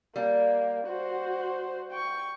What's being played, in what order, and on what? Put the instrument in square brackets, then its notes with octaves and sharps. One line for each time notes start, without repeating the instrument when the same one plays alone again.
[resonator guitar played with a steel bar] G3 [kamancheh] A#3
[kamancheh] F#4 C5
G5 C#6